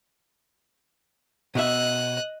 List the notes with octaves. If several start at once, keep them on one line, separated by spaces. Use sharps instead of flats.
B2 D#5 E5 F#6